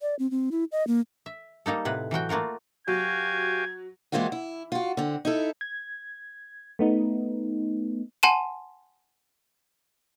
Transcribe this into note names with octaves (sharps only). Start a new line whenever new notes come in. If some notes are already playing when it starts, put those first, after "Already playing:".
D5
C4
C4
E4
D#5
A#3
E5
G3 A#3 D#4 A4
A2 C3 B4 F#5
E3 F#3 F#4 G5
A3 A#3 F4 F#4 A#4
F#3 F#4 G4 F5 G#5 G#6
E3 G#3 A#3 C4 F4 F#4
E4
F4 F#4
D3 C4
D#4 E4 A4
G#6
A3 B3 D#4
F#5 G#5 A5 C6 D#7 E7